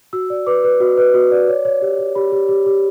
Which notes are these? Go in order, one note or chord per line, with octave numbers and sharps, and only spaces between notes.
F#4 E6
D5
B4 D6
B4
F#4
B4
F#4
D5
C#5
C#5
G4
C#5
G4 B5
G4
G4
G4